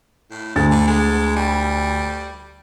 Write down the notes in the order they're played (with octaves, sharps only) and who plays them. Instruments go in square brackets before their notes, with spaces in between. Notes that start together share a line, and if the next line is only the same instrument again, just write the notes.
[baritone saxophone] A2
[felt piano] D2 A6 [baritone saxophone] G#3
[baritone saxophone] D3
G#3
G3